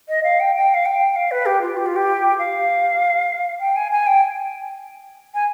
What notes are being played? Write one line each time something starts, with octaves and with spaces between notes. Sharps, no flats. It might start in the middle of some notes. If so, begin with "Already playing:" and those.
D#5
F5
G5
G5
F5
G5
F5
B4
G4
F4
G4
F4
G4
F5
G5
G#5
G#5
G5
G#5